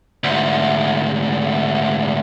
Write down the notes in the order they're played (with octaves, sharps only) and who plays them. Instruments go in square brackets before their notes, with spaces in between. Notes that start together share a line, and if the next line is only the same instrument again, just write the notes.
[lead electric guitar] D2 G#2